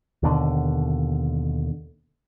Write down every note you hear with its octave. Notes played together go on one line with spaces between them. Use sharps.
D#2 B2 D3